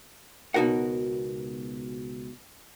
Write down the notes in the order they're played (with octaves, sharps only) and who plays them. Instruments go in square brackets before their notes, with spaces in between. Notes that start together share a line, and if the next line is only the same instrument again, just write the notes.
[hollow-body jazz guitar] C#2 B2 D#4 F#4 A#4 F#5